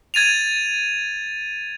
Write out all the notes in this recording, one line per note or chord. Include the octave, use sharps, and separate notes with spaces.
G#6 A6 D#7 F7